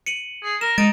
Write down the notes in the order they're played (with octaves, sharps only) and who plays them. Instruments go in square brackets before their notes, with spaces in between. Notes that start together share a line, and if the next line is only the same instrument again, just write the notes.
[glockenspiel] C#7 D#7 F#7
[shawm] G#4
[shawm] A#4 [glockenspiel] E7
[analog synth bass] G#3 [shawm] D#4 [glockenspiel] A6 D7 E7